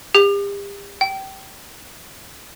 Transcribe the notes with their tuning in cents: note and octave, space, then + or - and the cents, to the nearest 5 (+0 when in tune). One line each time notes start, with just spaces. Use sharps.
G4 +40
G5 -25